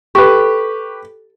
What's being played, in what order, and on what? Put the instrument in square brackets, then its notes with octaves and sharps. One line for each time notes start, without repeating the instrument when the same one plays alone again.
[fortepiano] G4 B4 [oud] A4 [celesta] C#6